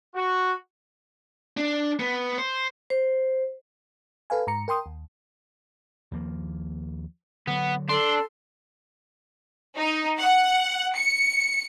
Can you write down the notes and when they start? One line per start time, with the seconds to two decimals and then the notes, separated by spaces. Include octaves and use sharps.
0.15 F#4
1.57 D4
2.00 B3
2.38 C5
2.90 C5
4.30 A4 B4 F5 G#5
4.47 G#2 A#5 C#7
4.68 A#4 G5 C6 D#6
4.86 D#2
6.12 D#2 F3 A#3
7.47 D3 F#3 B3
7.89 D4 A4 C6
9.77 D#4
10.19 F#5
10.95 C#7